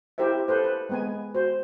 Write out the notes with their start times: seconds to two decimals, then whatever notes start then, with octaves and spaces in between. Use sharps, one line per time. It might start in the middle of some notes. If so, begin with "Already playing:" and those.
0.18 E4 G4 A#4 C5 E5
0.48 A4 B4 C5
0.64 B4
0.89 G#3 B3 G#5
1.34 F#4 C5